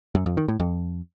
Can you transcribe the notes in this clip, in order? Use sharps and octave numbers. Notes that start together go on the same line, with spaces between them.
F#2
F2
D#3
A2
F2